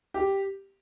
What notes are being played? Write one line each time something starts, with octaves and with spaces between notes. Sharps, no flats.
G4